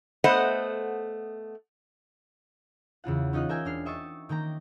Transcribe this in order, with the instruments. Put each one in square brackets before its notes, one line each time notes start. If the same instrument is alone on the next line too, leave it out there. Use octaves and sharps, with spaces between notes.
[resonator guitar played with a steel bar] A3 B3 C5 D#5 F#5
[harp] E2 C#3 F4 F#5
C#4 D#4 F4 D#5 F#6
A#4 E5 G5 G#5
E1 D4 F6 C7
D#5 E5 C#6 D#6 A6
D#3 A#3 G5 A#5